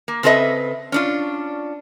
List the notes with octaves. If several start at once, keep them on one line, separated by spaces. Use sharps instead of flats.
A#3
C#3 C4 A4 B4 D#5 E5
C#4 D4 F4